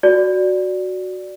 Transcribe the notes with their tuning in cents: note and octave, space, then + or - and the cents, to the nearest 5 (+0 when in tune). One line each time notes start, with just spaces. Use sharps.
F#4 +0 D5 +0